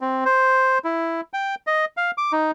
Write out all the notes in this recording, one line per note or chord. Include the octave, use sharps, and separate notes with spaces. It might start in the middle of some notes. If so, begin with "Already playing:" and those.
C4
C5
E4
G5
D#5
F5
D6
D#4